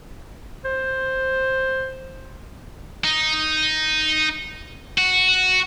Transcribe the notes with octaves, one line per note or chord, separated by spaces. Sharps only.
C5
D#4
F#4